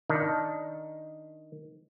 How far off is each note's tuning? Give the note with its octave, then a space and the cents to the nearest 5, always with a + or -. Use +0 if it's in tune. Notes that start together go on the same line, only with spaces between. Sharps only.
D#3 +0 D4 +0